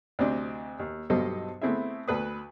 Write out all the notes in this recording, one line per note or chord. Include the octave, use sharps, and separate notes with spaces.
D2 C3 C4 D4 D#5
D#2
B1 G2 B2 A4 C5 D#5
A3 B3 C4 E4 G#4 E5
D2 A4 B4 D#6